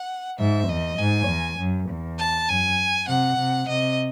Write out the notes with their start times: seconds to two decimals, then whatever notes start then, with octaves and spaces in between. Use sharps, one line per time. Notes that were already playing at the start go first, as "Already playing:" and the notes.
Already playing: F#5
0.39 G#2 E5
0.69 E2 D#5
0.99 G#2 G#5
1.28 E2
1.58 F#2
1.89 E2
2.18 A5
2.49 F#2 G#5
3.08 C3 F#5
3.38 C3
3.68 C3 D#5